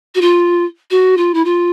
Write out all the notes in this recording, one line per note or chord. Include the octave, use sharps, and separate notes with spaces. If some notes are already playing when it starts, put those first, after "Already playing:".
F#4
F4
F#4
F4
E4
F4